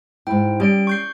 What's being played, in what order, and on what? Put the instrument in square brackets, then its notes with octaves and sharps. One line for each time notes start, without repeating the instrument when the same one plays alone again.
[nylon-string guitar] G#2 E4 [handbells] G5
[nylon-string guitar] G3 [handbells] C#4 D5 D7
[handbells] C#6 G6 C7